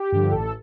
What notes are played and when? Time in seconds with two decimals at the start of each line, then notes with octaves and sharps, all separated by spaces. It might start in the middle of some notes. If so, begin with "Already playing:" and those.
Already playing: G4
0.12 G2 D3 F3
0.32 A1 A4